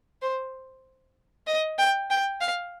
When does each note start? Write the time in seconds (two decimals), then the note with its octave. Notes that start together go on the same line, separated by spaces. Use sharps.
0.22 C5
1.47 D#5
1.79 G5
2.10 G5
2.41 F5